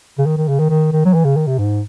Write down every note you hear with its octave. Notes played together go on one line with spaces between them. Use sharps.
C#3
D#3
D#3
C#3
D#3
D#3
D#3
F#3
E3
C#3
D#3
C3
G#2